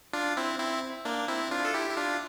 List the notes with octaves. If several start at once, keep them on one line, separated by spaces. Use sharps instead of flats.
D4 F4
C4 E4
C4 E4
A#3 D4
C4 E4
D4 F4
A4
E4 G4
E4
D4 F4